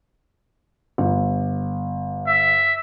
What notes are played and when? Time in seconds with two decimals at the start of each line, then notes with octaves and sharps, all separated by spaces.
0.98 G1
2.27 E5